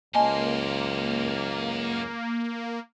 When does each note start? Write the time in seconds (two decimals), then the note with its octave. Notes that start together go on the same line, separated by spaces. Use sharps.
0.15 C#2 F#2 A#3 D#5 G#5 A5 C6